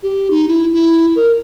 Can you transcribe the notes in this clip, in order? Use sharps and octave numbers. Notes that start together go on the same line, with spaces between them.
G4
D#4
E4
E4
A#4